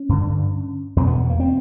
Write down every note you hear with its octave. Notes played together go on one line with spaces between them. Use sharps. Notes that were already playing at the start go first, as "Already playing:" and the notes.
Already playing: C#4
G2 D3
E2 B2 C4
B3
A#3
C4